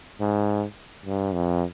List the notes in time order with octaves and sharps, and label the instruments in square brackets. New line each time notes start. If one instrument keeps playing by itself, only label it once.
[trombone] G#2
G2
F2